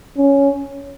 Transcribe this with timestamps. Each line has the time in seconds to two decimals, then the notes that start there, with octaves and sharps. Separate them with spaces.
0.18 C#4